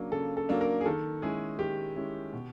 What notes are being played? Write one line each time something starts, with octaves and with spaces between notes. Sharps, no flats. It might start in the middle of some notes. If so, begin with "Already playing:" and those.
Already playing: C#3 F#3 A#3 D4
C#3 A4
A4
F#3 A#3 D4
A#4
G#4
D#3 A4
G#3 C#4 E4 G#4
D#3 G4
G#3 C#4 E4
B2